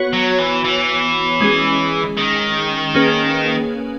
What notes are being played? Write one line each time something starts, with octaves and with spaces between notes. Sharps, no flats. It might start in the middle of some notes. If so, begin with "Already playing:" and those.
Already playing: B3 F#4 C#5
F#3
E3
E3
G#3 C#4 G#4
D#3
A#3 C#4 G#4 B4